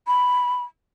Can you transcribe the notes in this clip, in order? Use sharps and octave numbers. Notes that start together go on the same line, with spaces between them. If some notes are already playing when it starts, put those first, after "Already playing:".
B5